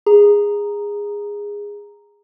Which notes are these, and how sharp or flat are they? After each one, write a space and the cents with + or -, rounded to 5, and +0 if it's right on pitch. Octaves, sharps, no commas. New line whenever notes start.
G#4 -15 A#5 +0